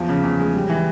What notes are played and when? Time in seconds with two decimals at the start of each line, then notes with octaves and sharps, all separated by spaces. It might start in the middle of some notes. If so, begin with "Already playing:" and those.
Already playing: E2 F3
0.09 C#3
0.23 E2
0.39 G#3
0.54 G3
0.70 E3